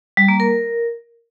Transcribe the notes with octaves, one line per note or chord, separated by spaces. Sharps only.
G3
A#3
A#4